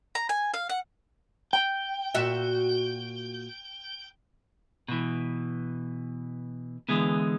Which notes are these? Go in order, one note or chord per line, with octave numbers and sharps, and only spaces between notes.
A#5
G#5
F5
F#5
G5
A#2 F#4 E5
B2 E3
D3 E3 G#3 B3